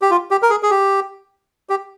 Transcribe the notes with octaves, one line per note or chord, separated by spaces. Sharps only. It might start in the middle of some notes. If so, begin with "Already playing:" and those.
G4
F4
G4
A#4
G#4
G#4
G4
G4